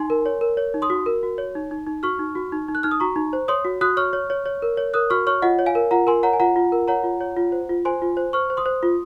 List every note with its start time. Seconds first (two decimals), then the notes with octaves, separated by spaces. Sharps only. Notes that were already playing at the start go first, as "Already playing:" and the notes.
Already playing: D#4 G#5 C6
0.10 A#4
0.26 C#5
0.41 A#4
0.57 C#5
0.74 D#4
0.82 C6 D#6
0.90 F#4
1.06 A#4
1.23 F#4
1.38 C#5
1.55 D#4
1.71 D#4
1.86 D#4
2.03 F#4 C#6 F6
2.19 D#4
2.35 F#4
2.52 D#4
2.68 D#4
2.75 F#6
2.83 D#4 F6
2.91 D#6
3.00 F#4 A#5 C#6
3.16 D#4
3.33 C5
3.48 C#5 C6 D#6
3.65 F#4
3.81 F#4 D#6 F#6
3.97 C#5 C#6 F6
4.13 C#5
4.30 C#5
4.46 C#5
4.62 A#4
4.77 C#5
4.94 A#4 D#6 F#6
5.10 F#4 C#6 F6
5.27 C#5 C#6 F6
5.42 F4 D#5 F#5
5.59 C#5
5.66 F5 G#5
5.75 A#4
5.91 F4 F#5 A#5
6.07 A#4 G#5 C6
6.23 C#5 F#5 A#5
6.33 G#5
6.40 F4 F#5 A#5
6.56 F4
6.72 A#4
6.88 C#5 F#5 A#5
7.04 F4
7.21 C#5
7.37 F4
7.52 C5
7.69 F4
7.85 C5 G#5 C6
8.02 F4
8.17 C5
8.33 C5 C#6 F6
8.50 C5
8.57 C6 D#6
8.66 C5
8.83 F4